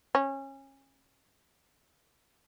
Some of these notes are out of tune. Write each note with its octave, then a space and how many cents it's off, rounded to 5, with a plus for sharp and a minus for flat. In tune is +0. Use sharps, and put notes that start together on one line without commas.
C#4 -25